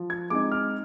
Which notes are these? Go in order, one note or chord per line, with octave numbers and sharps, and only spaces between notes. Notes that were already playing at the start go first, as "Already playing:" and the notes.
Already playing: F3
G#6
G#3 C4 D#4 D6
F6